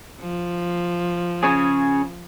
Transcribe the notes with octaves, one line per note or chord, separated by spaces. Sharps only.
F3
C#3 C#4 G#4